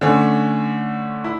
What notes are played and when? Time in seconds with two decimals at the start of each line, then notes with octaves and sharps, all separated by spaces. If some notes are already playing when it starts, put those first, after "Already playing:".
0.01 D3 A3 C#4
1.24 E4